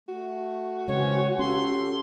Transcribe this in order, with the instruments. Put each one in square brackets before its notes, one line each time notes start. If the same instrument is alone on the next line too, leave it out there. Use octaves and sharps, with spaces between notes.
[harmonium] A3 [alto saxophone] F#4
[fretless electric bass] C#3 G#3 [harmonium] E3 C4 C#4 [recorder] C#5
[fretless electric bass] C#4 [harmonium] F4 G4 A4 [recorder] C6